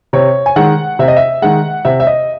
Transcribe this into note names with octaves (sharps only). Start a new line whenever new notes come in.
C3 C#5
G#5
D#3 G#3 F#5
C3 E5
D#5
E5
D#3 G#3 F#5
C3 E5
E5
D#5